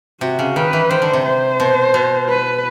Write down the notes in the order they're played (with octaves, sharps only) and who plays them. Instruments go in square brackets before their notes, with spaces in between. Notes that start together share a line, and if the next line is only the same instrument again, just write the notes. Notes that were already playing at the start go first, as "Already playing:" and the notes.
[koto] C3 [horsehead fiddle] F#4
[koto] C#3
[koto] D#3 [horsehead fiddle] B4
[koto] E3
[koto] D#3 [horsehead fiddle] C5
[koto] D3
C3
[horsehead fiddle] C5
[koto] B2
B2
[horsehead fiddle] B4